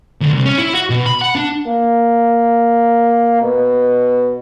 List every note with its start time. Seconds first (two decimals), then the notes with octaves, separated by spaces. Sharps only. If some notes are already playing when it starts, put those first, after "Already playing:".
0.21 D2
0.33 C2
0.45 C#4
0.59 E4
0.73 F#4
0.90 B2
1.06 B5
1.21 F#5
1.35 D4
1.67 A#3
3.42 B2